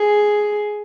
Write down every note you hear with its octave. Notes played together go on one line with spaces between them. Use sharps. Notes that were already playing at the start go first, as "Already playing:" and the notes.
Already playing: G#4